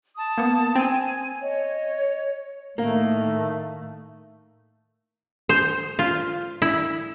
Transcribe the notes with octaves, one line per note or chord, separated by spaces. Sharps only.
A5 D#6
A#3 B3
C4 G#5 G#6
C#5 D#5
A2 D#3 A3 A#3
C5
F4
E4